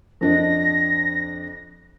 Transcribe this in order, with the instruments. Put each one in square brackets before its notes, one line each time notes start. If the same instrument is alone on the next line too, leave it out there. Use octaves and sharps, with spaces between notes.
[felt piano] F2 D4 D#5 [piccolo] A#6